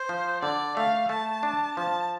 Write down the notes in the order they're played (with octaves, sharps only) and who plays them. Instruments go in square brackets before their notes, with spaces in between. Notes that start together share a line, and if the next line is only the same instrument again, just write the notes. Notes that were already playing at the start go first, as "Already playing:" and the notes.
Already playing: [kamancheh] C5
[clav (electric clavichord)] F3
[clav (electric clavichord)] D3 [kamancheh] D5
[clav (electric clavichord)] A3 [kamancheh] F5
[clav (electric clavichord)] A3 [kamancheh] A5
[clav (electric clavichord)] D4
[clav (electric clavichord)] F3 [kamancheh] A5